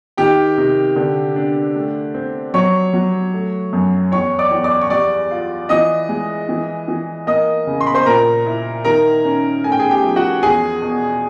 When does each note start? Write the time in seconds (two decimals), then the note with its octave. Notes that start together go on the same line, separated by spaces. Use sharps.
0.17 D#3 G4 G5
0.58 C3
0.96 D3
1.36 D4
1.75 A3
2.14 C4
2.54 F#3 C#5 C#6
2.93 F#3
3.34 A3
3.73 F#2
4.12 E2 C#5 C#6
4.39 D5 D6
4.51 E2
4.64 D5 D6
4.81 C#6
4.90 G3 D5 D6
5.31 F4
5.69 E3 D#5 D#6
6.09 G#3
6.49 E3
6.88 E3
7.27 A#3 D#5 D#6
7.67 C#3
7.81 C6
7.87 B5
7.94 C5 C6
8.06 A#2 A#4 A#5
8.46 E4
8.84 D#3 A#4 A#5
9.25 C#4
9.64 A3 G#5
9.72 G5
9.79 G#4 G#5
9.90 G4 G5
10.04 F3
10.16 F#4 F#5
10.43 E2 G#4 G#5
10.82 B2